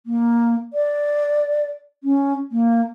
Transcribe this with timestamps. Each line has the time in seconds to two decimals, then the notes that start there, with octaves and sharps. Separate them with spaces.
0.06 A#3
0.73 D5
2.04 C#4
2.52 A#3